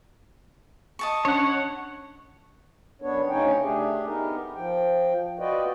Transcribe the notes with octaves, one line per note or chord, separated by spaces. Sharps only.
D#5 A5 C#6
C#4 D4 C#5 F#5
F#2 B3 D4 C#5
D2 C#3 C#4 D#4 C#5 G5
A3 D4 G4 G#4
B3 D#4 G4 A#4
F3 G5
F4 F#4 B4 D5 D#5 G5